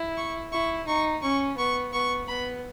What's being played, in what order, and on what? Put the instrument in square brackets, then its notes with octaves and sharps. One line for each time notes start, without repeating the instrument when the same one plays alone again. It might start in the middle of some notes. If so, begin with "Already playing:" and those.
Already playing: [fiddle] E4
[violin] C#6
[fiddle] E4 [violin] C#6
[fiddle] D#4 [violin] C#6
[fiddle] C#4 [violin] C#6
[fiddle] B3 [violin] C#6
[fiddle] B3 [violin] C#6
[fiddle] B3 [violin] B5